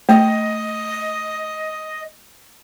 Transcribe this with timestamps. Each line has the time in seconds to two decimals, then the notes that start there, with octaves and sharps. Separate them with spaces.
0.09 A3 D#5